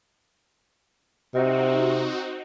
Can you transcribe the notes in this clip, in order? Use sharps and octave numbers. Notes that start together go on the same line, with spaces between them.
C3 C4 D#4 F#4